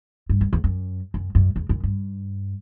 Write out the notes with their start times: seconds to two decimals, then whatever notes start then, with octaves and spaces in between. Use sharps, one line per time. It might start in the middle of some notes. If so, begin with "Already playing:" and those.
0.29 G2
0.41 F#2
0.53 E2
0.64 F#2
1.14 F#2
1.35 F#2
1.56 E2
1.69 F#2
1.84 G2